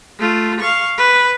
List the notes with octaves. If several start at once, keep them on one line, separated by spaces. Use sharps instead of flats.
A3 F4
F5 C#6
B4